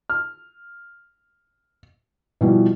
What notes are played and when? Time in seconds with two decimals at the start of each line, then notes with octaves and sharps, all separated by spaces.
0.10 F6
2.41 B2 E3 F3 G3